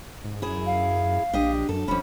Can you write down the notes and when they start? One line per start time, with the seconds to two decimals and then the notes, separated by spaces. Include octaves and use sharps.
0.24 G#2
0.42 F#2 E4 G#4
0.66 F5
1.33 A#1 D4 G4 D#5
1.69 F#2 A4
1.88 D#1 F2 C#4 B5